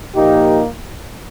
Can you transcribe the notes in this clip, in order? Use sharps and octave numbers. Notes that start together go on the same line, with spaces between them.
A#2 F3 A#3 D#4 G4